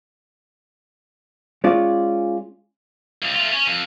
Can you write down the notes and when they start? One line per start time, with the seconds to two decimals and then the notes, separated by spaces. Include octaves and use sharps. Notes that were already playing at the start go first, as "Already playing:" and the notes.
1.64 G#3 C#4 F4 D5
3.22 C#2
3.35 A3 F4
3.52 C#4
3.67 F2